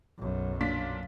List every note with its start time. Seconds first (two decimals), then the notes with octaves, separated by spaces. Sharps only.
0.18 B1 F#2
0.61 A#2 D4 B6